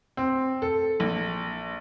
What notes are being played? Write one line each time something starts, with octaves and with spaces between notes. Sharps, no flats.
C4
A4
A#1